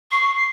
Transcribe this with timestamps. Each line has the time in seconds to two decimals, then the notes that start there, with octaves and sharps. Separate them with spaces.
0.11 C#6 C7
0.36 C7